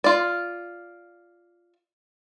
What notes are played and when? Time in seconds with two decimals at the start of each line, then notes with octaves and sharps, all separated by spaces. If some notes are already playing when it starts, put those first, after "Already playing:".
0.04 F4 D5